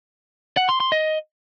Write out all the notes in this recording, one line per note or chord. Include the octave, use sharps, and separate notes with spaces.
F#5
C6
C6
D#5